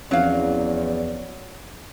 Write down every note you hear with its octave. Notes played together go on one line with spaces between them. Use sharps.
E2 F3 F#3 C4 C#4 D5 F5